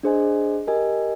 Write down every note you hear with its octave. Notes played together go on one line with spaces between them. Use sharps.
D4 G#4 C5 D#5 G#5
G4 A#4 D#5 G#5